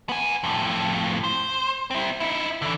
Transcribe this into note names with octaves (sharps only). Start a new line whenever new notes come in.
B3 G#5
F2 A2
C5
C4 E4
D#4 E4
D3 E3